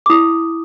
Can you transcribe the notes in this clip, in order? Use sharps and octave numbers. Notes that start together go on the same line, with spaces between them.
D6
E4 D#6